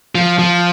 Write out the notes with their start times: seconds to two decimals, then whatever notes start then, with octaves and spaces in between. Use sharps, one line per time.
0.15 F3
0.39 F3